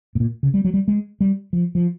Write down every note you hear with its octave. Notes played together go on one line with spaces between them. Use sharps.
A2
A#2
C#3
G3
F#3
G3
G#3
G3
F3
F3